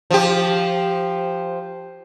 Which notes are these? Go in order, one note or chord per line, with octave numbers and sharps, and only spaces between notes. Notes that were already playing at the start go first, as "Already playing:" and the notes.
F3 G4